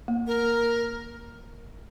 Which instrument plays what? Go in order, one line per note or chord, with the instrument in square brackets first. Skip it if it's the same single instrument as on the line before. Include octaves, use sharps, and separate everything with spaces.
[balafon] A#3
[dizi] A#4